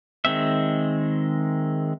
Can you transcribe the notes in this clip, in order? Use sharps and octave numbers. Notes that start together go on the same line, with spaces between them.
D#3 G#3 C4 E5